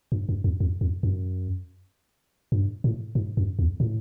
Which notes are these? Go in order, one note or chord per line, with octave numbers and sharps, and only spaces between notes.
G2
F#2
F2
F2
F2
F#2
G2
A2
G#2
F#2
E2
A2